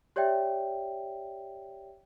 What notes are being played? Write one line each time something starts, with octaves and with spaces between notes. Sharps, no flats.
G4 C#5 D5 E5 G5